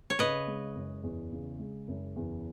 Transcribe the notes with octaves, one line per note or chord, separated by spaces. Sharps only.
C#5
C#3 B4 D#5
G#3
F#1
E2
C#3
G#3
F#1
E2